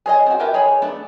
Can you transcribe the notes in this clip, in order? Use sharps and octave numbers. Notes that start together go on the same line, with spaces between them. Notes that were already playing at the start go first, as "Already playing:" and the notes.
G#4 C#5 D#5
C4 F#4
G4 A#4 B4 D#5 E5
D#4 G#4 C#5 B5
A3 B3 D4 A4